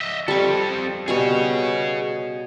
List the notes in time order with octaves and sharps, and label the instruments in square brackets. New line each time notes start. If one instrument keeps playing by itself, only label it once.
[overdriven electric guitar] D#5 E5
[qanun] G3 C#6 [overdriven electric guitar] C4 A4
[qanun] B2 G3 G#5 [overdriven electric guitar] G#4 C#5